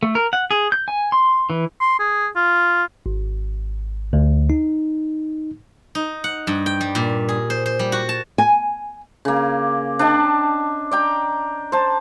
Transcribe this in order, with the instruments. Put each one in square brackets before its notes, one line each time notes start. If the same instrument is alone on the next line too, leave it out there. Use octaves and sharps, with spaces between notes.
[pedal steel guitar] A3
A#4
F#5
G#4
G6
G#5
C6
E3
[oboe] C6
G#4
F4
[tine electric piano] G#1
D2
D#4
[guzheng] D#4
F#5
G2
G5
G3
A#2
G#4
C5
C5
G3
F#4
A5
[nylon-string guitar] G#5
[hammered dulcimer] C#3 A#3
D4 D#5 G5 A5
D5 G5 A#5
C5 A5